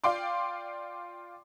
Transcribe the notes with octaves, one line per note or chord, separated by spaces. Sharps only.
F4 D5 F5 G5 C6 D6